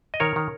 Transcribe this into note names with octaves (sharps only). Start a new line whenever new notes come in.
D#5
D#3 A#4 C#5
D#3